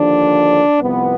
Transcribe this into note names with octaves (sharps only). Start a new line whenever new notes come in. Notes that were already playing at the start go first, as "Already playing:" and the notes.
Already playing: D#2 D3 F3 D4
C2 C3 F3 B3